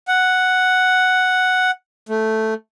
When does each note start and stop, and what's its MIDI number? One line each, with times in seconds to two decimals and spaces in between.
0.08 1.71 78
2.09 2.54 57